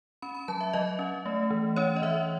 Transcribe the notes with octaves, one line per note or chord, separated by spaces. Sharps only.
C#4 B5
B5
F#3 A5
E5
F#3 D#5
C#4
A3
E3
C#4 C#5
D#5
E3 E5